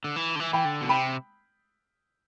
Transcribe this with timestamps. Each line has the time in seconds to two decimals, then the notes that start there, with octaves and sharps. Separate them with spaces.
0.04 D3
0.16 E3
0.36 D3
0.40 E3
0.53 E3 G5 B5
0.65 D3
0.81 B2
0.89 C3 G5 B5